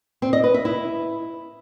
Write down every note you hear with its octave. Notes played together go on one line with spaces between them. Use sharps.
C4
D#5
B4
E5
E4